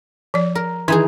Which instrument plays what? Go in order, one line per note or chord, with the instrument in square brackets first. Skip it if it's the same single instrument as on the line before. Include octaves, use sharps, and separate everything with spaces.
[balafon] F3 D5
[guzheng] A#4
[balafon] D#3 [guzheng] E3 D#4 G#4